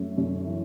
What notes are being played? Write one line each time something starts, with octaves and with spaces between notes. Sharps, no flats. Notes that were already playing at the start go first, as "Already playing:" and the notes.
Already playing: F#2 A3
F#2
E3